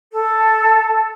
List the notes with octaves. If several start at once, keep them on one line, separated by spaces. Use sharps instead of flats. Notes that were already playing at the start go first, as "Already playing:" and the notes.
A4